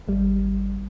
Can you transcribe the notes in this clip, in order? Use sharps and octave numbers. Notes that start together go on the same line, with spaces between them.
G#1 G3